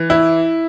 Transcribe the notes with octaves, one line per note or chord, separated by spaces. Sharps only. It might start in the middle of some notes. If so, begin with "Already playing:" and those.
Already playing: E3
E4